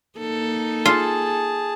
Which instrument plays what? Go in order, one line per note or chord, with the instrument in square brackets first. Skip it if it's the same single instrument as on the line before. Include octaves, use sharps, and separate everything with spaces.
[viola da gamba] A#3 D#4 A4
[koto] F4 [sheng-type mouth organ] G#4 A5